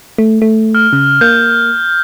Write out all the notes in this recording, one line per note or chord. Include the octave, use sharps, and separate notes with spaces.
A3
A3
F6
C#3
A#3 G6